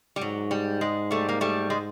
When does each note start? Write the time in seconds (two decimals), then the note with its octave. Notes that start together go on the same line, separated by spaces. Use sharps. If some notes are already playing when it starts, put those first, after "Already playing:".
0.16 G3
0.21 G#2 F#3
0.51 G3
0.81 G#3
1.11 G3 A3
1.29 A#3
1.41 G3 A3
1.70 G#3